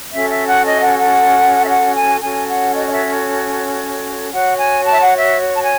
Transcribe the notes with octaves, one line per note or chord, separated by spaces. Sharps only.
C#4 F#4 A4 E5
E5
F#5
D#5
E5
F#5
F#5
E5
F#5
G#5
C#4 F#4 A4 C#5 G#5
F#5
D#5
D#5
E5
F#4 C#5 F#5
G#5
A5
E5
F#5
E5
A5
G#5